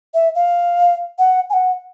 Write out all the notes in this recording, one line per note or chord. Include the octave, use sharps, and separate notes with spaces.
E5
F5
F#5
G#5
F#5